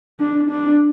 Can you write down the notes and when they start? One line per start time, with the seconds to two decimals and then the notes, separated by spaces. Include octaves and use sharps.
0.20 D4
0.50 D4